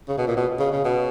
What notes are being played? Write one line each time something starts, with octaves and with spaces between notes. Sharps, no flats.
C#3
B2
A#2
B2
C#3
C#3
B2